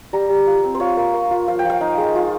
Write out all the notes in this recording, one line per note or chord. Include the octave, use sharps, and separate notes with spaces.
G3 A#5
G3
F4
C4
C5
F4 C#5
A#3
A#3
F4
F3 F5
G5
F3 F5
D#4
G#3
F4